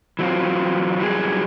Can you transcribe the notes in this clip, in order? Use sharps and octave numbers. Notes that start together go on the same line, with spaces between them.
E3 F#3 C4 F4
E3 F#3 G3 G#4